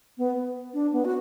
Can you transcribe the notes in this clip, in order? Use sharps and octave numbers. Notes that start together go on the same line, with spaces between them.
B3
D4
B3
F#4